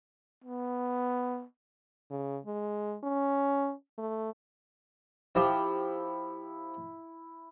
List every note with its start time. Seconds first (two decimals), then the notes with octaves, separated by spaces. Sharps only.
0.44 B3
2.10 C#3
2.46 G#3
3.04 C#4
3.98 A3
5.35 F3 E4 G4